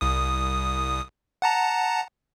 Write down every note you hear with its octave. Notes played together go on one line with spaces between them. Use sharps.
C2 D#6
F#5 A5 A#5